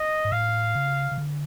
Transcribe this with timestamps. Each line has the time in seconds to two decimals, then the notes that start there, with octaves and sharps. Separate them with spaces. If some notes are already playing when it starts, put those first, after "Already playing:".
Already playing: D#5
0.25 G#2
0.32 A2 F5
0.75 C#3
1.12 C#3
1.18 D3